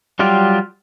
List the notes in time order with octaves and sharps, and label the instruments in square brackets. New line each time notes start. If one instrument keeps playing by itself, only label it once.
[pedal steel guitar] F#3 G3 F4 G4